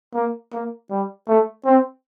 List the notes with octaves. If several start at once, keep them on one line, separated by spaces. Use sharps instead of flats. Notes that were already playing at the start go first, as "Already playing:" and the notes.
A#3
A#3
G3
A3
C4